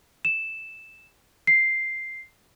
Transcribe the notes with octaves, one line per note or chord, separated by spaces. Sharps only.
E7
C7